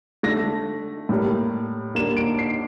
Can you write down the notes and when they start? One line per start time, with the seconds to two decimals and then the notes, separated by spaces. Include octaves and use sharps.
0.23 D3 A3 A#6
1.09 A2 G3 A#3
1.95 D3 G3 A#3 E7
2.17 D7
2.39 C7